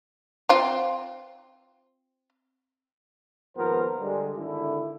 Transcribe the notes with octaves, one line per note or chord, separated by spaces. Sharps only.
C4 F4
D#2 G#2 F3 B3 A#4 C5
D3 G3 G#3
G#1 D3 D#3 E4